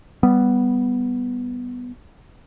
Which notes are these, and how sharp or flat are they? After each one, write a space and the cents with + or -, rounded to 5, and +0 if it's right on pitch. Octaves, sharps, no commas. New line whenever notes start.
G3 +0 B3 +0